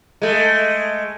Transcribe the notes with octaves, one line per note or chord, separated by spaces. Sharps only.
G#3 A3